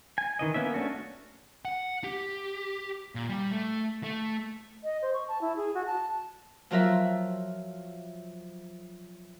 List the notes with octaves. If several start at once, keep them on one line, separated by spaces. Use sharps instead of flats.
G#5
D#3 E3 D#5
A#3 B3 C#4 E5
A3 C#4 D4 F#4
F#5
G4
A#2
G3
A3
A3
D#5
C5
C#6
A5
E4
G#4
F#4
A5
F3 F#3 F4 A#4 E5